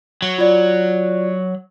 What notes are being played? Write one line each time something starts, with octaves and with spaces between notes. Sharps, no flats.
F#3
F4 D5